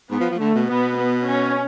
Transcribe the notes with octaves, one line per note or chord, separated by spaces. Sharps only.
G#2 B3
F3
F3
D3 A3
B2
B2 B3
B3
C#4